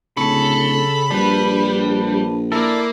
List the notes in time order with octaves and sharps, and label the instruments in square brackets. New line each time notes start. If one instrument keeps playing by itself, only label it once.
[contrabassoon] D1 [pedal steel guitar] C#3 C#6 [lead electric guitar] A4 [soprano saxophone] B5
[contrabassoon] A#1 [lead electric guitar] G3 [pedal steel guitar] D4 B4
[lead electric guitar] A#3 [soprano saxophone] E4 [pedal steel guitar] A4 D5